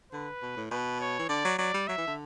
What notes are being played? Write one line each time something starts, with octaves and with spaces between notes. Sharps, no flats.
D3 B4
B2
A2
B2 B4
C#5
E3
D3 D5
F#3
F#3 D5
G3
F#3 E5
E3
D3